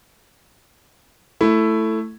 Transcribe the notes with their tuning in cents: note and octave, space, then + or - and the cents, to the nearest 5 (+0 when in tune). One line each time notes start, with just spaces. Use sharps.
A3 +5 E4 +5